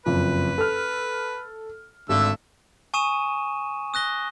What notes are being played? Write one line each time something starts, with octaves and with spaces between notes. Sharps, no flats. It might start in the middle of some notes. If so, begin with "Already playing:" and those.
F#1 F2 B4
A4 F6
G#1 D3 A3 E6
G#5 C#6 D#6 D#7 E7
D#6 F#6 A#6 G7